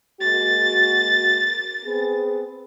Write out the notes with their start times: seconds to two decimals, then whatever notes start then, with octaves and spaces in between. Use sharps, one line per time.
0.21 G#3 A#3 F#4 A6
1.85 B3 C4 G#4